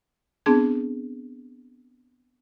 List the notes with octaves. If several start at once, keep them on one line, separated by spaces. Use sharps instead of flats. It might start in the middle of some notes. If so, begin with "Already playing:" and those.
B3 C4 D4 G#4 A5 G#6